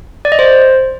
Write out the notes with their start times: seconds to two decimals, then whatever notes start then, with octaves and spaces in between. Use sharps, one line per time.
0.25 D5
0.32 D#5
0.39 C5